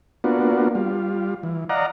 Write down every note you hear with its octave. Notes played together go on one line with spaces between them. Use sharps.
A#3 B3 D4 F4 F#4
G3 F4
E3
D5 D#5 F5 F#5 A#5